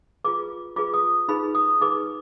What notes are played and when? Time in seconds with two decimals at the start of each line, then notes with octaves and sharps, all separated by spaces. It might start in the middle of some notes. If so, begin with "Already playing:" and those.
0.24 F4 G#4 B4 D6
0.76 F4 G#4 B4 D6
0.94 D#6
1.28 D#4 G#4 B4 B5
1.55 D#6
1.81 D#4 G#4 B4 D6